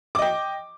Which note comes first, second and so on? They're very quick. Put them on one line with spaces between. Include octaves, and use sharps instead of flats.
D6 D#5 G5